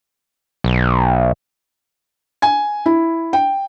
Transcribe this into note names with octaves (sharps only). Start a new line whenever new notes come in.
B1
G#5
E4
G5